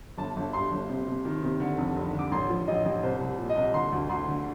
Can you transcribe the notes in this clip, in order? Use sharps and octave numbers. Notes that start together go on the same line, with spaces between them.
G1 A5
G1
G2 C6
G1
C3
C3
D#3
C3
D3
F1
F1
D3
D6
A1 C6
F3
A1 D#5
A1
C2 C5
C2
A#2
D#5
C2
D3 C6
D2
D2 C6
D3